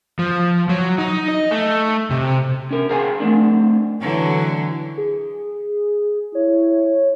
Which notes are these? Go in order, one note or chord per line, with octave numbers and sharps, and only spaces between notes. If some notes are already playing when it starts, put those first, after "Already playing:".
F3
F#3
D#4
D#5
A3
C3
C#4 A#4
G#4 A#4 C#5 F5 G5 G#5
A3 C4 D4
D3 E3 F#3
G#4
E4 C#5